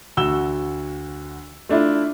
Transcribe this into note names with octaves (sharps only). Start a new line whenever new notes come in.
D2 F#4 E6 E7 G7
A3 D4 E4 F4